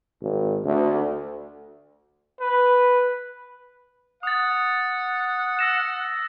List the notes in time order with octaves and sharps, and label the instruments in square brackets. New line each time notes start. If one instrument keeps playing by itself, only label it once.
[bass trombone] G#1
D2
[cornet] B4
[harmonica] F#5 [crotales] D#6 A6
[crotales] E6 A#6 E7